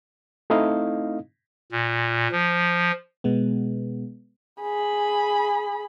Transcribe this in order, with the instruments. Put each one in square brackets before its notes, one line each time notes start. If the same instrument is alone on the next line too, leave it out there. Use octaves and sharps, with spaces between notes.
[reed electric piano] A3 C4 D#4 E4 D#5 F5
[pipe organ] A#2
F3
[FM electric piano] B2 G#3 B3
[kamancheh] G#4 B5